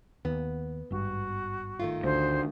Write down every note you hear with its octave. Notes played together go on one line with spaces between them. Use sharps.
D#2 B3
G#1 G2 F#4
D#3 A3 F4
D2 C5